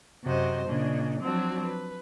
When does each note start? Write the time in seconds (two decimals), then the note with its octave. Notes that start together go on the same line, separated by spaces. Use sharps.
0.23 F#2 C3 F#4 C5 D#5
0.67 A#2 C#3 D4 D#5
1.21 F3 F#3 C4 D4 F#4
1.63 B4